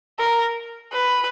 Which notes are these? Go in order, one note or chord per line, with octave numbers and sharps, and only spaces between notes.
A#4
B4